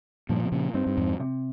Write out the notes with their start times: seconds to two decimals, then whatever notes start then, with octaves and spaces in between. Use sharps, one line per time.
0.29 G2 A#2 F3
0.43 C3
0.52 A#2 C#3
0.74 G2 C4 D#4
0.87 G2
0.97 F2 G#2
1.20 C3